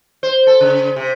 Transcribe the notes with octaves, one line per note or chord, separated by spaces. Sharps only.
C5
A4
C#3
C3